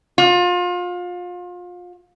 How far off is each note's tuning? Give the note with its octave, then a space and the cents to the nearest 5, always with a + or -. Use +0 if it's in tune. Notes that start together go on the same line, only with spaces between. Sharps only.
F4 +30